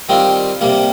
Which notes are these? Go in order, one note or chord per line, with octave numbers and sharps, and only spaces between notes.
D#3 G3 C4 F4
C3 G3 A#3